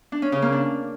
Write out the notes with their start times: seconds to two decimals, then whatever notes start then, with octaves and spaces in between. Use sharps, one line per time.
0.12 D4
0.22 C#4
0.32 C#3
0.42 A#3
0.52 D4